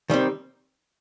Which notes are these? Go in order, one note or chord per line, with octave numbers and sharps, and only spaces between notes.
D#3 G3 C4